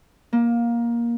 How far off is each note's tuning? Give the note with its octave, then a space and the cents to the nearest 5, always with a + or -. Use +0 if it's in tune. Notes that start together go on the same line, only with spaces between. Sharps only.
A#3 +15